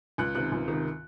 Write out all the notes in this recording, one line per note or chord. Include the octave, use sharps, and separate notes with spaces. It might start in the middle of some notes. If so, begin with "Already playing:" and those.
C#2 F#6
C3 D#3 F#6
C#2
C3 D#3